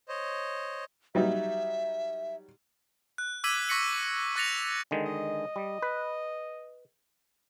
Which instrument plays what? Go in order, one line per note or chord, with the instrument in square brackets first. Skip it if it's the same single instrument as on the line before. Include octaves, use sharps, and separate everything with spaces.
[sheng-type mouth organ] C5 C#5 D#5
[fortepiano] F#3 G3 D#4 [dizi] E5
[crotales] F#6
D6 E6 G#6 B6 D#7 F#7
C#6 A#6 B6 C#7 F#7
C#6 F#6 A6 A#6 C#7 F7
[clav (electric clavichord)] D3 D#3 G#3
[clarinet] D#5
[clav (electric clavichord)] G3
B4